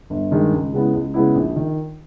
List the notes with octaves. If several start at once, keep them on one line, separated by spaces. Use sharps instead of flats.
G1
G2 D#3 G#3
C#2
C#3 G#3 B3 E4
C#2
C#3 G#3 B3 E4
A#1
D#3